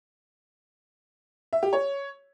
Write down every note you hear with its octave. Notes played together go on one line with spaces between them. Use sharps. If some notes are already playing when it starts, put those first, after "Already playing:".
E5
G4
C#5